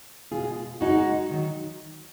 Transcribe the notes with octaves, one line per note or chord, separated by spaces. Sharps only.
B2 G#3 F4 G#4
F#2 C#3 G#3 D#4 F#4
D#3 F#3